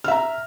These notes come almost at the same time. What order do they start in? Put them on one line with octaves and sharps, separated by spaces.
F6 E5 A#5